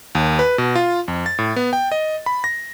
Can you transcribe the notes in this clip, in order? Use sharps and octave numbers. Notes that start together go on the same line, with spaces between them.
D#2
B4
B2
F4
F2
A6
A2
B3
G5
D#5
B5
A#6